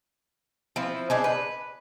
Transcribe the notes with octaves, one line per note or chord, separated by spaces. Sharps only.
F3 C4 E4
D4 D#4 G#4
B4